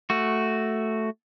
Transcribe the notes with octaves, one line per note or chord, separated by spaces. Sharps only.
A3 F#4